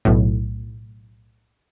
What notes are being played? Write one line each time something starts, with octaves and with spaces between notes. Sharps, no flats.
B1 A2